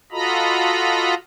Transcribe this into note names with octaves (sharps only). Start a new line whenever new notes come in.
F4 F#4 A4 D#5 A#5 B5